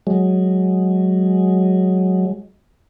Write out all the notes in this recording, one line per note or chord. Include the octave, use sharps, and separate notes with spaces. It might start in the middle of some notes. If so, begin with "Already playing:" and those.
F#3 G#3